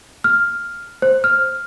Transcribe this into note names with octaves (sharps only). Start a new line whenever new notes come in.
F6
C5
F6